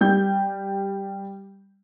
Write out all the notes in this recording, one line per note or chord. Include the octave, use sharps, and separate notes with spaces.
G3 G6